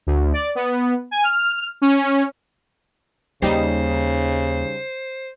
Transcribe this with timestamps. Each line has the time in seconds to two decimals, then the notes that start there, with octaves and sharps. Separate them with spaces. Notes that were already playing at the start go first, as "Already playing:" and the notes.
0.07 D2
0.33 D5
0.55 B3
1.11 G#5
1.24 F6
1.82 C#4
3.42 D#2 C#3 G3 D#4 C5